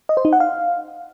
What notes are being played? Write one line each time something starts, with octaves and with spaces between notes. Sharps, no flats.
D#5
C5
D#4
F#5
F5